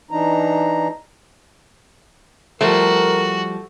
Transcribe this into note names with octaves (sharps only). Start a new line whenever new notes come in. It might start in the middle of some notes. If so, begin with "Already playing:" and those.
E3 D4 D#4 A#5
F3 G3 A3 F#4 A#4 C5